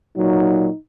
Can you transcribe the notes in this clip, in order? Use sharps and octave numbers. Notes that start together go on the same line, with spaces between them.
A#2 F#3 D#4